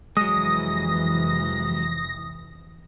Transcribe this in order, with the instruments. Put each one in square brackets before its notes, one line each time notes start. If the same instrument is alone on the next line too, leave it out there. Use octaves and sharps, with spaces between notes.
[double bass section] F2 C3 E3 [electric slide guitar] F#3 G#3 [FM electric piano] D#6 [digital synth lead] A#6